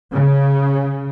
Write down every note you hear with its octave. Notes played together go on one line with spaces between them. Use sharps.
C#3